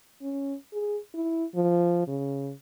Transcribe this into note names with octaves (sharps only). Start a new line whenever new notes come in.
C#4
G#4
E4
F3
C#3